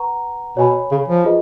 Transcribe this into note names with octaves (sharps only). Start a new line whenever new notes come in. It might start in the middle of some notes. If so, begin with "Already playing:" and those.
Already playing: B4 F#5 A#5 C#6
B2 C#5 G#5 B5
C#3
F3
F4 G#4 B4 D#5